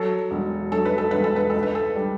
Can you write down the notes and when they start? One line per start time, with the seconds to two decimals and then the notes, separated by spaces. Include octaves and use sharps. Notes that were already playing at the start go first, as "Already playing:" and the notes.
Already playing: F#3 A4
0.31 E1
0.71 F#3 A4
0.85 B4
0.98 A4
1.11 E1 B4
1.24 A4
1.36 B4
1.50 C#2 A4
1.63 B4
1.75 A4
1.95 G3